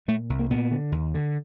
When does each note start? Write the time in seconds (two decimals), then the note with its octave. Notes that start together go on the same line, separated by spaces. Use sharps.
0.08 A#2 A3
0.30 C2
0.39 A#3
0.50 A#2 B3
0.71 D3
0.92 D#2
1.14 D3